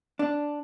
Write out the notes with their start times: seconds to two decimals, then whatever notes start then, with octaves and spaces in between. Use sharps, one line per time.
0.19 D4